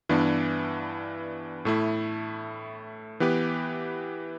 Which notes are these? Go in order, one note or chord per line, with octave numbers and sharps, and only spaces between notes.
G2 E3 B3 D4
A2 A3 E4
E3 B3 G4 B4